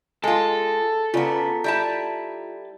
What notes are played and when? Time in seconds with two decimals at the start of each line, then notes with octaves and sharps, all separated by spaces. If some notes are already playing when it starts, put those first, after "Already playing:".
0.24 G#3 F4 A4 G#5
1.14 C#3 B3 F4 D5 A#5
1.64 G3 E4 A5